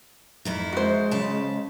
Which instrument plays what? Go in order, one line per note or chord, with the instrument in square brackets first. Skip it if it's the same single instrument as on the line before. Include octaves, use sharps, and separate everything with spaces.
[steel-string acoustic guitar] F2 D#3 E4
[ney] G#3 [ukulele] F#4 C5
[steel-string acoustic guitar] C#3 A5